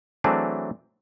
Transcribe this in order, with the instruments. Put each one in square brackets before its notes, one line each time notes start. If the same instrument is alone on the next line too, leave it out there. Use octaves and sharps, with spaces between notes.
[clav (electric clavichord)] E3 F#3 A3 C4 D4 G#4